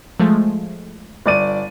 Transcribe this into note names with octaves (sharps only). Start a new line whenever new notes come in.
F3 G#3 A3
G1 D5 D#7